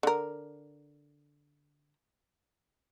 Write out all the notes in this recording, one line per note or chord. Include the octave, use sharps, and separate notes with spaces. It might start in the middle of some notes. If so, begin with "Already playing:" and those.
D3 A#4